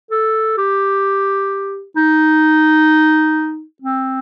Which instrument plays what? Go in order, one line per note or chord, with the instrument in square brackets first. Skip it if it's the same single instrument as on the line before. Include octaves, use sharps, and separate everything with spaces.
[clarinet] A4
G4
D#4
C4